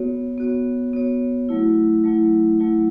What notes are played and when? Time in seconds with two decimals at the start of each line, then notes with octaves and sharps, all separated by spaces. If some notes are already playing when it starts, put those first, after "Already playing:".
Already playing: B3 F#4 C#5
0.38 B3 F#4 C#5
0.93 B3 F#4 C#5
1.49 F#3 A3 E4
2.04 F#3 A3 E4
2.59 F#3 A3 E4